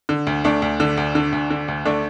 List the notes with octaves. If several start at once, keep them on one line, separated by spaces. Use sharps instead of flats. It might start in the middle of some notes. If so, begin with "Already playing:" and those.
D3
D2
D2 A3 D4
D2
D3
D2
D3
D2
D3
D2
D3 A3 D4